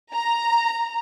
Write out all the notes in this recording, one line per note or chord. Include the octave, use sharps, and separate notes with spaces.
A#5